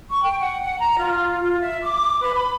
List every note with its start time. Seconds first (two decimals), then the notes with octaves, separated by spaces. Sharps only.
0.10 C#6
0.23 G5
0.40 F#5
0.61 F#5
0.80 A#5
0.98 F4
1.42 F4
1.61 E5
1.82 D6
2.22 B4
2.34 B5